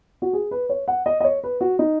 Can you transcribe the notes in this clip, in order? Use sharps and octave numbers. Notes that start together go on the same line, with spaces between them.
F#4
G#4
B4
C#5
F#5
D#5
D#5
C#5
B4
F#4
D#4